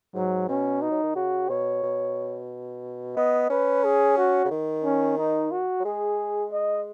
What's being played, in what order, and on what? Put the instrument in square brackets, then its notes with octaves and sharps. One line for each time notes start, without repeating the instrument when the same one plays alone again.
[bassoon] G#2 [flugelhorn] F#3
[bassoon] B2 [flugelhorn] C#4
[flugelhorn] D#4
[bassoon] F#3
D#3
[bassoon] C#3 [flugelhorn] F#4
[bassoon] B2 [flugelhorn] C#5
[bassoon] B2
[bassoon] B3 [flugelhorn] D#5
[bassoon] C#4 [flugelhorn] B4
[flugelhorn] G#4
F#4
[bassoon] C#3
D#3
[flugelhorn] C#4
D#4
F#4
[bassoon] F#3
[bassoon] G#3 [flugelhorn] G#4
[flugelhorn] D#5